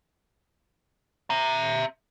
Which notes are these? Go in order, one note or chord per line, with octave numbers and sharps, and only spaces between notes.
E5 A#5